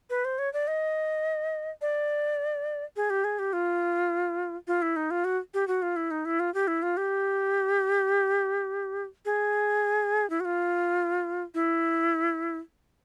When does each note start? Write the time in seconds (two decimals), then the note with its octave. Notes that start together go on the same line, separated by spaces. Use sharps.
0.10 B4
0.25 C5
0.39 C#5
0.53 D5
0.67 D#5
1.82 D5
2.96 G#4
3.10 G4
3.24 G#4
3.39 G4
3.53 F4
4.67 F4
4.82 E4
4.96 D#4
5.11 F4
5.25 F#4
5.54 G4
5.68 F#4
5.82 F4
5.96 E4
6.11 D#4
6.25 E4
6.40 F4
6.54 G4
6.67 E4
6.82 F4
6.97 G4
9.25 G#4
10.30 E4
10.40 F#4
10.45 F4
11.54 E4